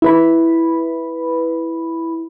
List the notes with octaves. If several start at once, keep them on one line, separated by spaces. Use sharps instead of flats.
E4 B4 B5